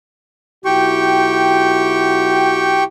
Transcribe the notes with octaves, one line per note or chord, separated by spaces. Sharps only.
B1 E4 F#4 G4 G5 C#6